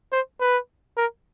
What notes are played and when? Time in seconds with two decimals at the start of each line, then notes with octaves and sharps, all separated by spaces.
0.12 C5
0.40 B4
0.97 A#4